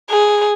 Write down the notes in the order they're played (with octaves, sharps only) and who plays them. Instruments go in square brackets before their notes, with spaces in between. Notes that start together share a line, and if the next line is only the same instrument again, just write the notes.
[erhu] G#4